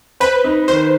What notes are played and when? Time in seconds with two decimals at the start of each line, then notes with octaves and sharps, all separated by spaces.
0.20 B4 C5
0.44 D#4
0.68 D#3 C5